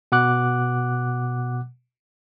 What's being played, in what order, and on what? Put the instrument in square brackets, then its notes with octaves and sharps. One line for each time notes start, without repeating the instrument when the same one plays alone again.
[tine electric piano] B2 F#5 D6 F#6